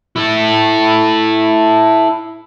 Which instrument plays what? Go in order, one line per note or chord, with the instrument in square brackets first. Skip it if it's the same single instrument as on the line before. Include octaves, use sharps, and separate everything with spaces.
[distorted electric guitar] E4 A4